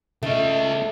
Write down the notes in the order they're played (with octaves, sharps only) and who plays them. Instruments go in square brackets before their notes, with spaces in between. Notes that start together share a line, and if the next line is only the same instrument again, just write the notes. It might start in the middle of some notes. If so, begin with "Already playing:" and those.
[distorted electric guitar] C#3 D#5 [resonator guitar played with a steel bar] A3